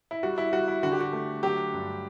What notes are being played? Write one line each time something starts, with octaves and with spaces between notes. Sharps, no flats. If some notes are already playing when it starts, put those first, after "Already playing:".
E4
G3 F#4
E4
G3 F#4
E4
D3 F#4
G4
F#4
A3
F#3 G4
G2